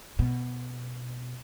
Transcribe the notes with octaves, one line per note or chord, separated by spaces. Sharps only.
B2